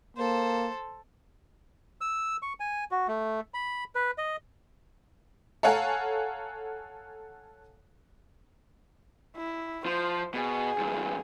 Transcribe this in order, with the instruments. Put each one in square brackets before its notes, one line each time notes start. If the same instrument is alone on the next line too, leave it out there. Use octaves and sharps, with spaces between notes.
[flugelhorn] A#3 [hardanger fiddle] A4 C5
[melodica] E6
C#6
G#5
F#4
A3
B5
B4
D#5
[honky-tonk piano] A4 C#5 F5 F#5 G#5 A#5
[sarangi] E4
[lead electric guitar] F3 [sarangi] C5
[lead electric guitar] B2 [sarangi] G#4
[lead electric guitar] E2 G2